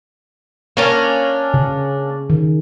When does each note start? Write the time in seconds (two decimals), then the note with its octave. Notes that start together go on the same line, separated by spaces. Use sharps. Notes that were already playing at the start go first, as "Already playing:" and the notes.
0.77 A#3 C#4 D4
1.54 C#3
2.30 D#3